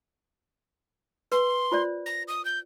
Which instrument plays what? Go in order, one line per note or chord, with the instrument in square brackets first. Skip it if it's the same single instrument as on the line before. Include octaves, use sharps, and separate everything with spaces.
[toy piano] B4 [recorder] C6
[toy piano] F4 C5 D5
[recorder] A#6
D#6
G6